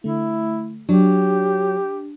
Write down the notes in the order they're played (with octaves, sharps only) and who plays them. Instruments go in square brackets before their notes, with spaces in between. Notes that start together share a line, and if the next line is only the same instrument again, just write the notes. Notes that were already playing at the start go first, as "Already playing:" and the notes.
[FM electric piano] D3 A3 [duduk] E4
[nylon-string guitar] F#3 [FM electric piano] D4 [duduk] G4